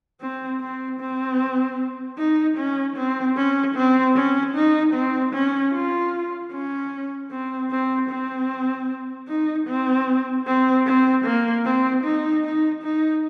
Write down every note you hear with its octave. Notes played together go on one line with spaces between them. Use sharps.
C4
C4
C4
D#4
C#4
C4
C#4
C4
C#4
D#4
C4
C#4
F4
C#4
C4
C4
C4
D#4
C4
C4
C4
A#3
C4
D#4
D#4
D#4